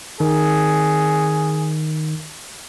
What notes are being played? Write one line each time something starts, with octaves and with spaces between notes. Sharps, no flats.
D#3 G#4